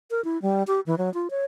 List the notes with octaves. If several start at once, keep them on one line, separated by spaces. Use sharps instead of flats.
A#4
E4
G3
G4
E3
F#3
F4
C#5